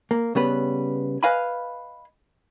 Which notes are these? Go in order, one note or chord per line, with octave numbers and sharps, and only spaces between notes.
A#3
C#3 G3 B3 B4
B4 D#5 F5 G#5 B5